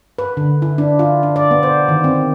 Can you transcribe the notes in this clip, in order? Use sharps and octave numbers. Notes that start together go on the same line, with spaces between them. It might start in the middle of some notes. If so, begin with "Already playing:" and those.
B4
D3
E4
D4
F4
D4
D5
B3
C5
D#3
C4